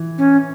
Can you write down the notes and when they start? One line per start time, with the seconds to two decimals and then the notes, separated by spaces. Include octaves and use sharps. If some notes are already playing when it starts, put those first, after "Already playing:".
Already playing: E3
0.18 C#4